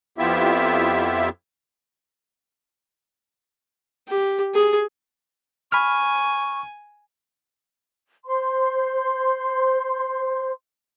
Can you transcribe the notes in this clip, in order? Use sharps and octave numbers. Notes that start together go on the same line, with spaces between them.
F2 B3 E4 F4 G4 E5
G4
G#4
G#5 B5 C#6 F6
C5 C6